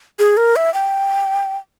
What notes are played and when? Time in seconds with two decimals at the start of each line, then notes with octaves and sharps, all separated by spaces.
0.19 G#4
0.37 A#4
0.56 E5
0.74 G5